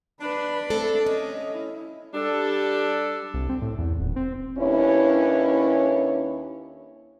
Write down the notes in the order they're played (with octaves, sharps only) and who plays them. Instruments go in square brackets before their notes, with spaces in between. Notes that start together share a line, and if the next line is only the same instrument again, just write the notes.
[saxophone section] D4 [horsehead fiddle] B4 B5
[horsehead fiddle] A3 [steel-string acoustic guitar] C4 A4
[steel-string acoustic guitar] C#4 [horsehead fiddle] D#5
[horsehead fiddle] E4
[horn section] G3 D4 A4
[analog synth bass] C2
C4
A2
E2
D#1
C4
[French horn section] D#2 C#4 D4 E4 B4 C#5